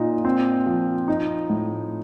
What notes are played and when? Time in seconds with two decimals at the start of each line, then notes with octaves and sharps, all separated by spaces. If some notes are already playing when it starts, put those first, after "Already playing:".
Already playing: A#2 D#4
0.25 C4
0.66 F3
1.08 D#4
1.50 A2